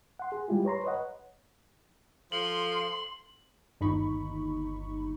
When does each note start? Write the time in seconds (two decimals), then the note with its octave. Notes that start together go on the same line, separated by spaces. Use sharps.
0.19 F#5 C6
0.32 G#4
0.48 G3 G#3 E4 F4 G4
0.65 B4 C#5 A#5 C6
0.84 B4 C#5 D#5 F#5
2.32 F3 A4 C6 F#7
3.80 G1 D#2 D#4 B5 C#6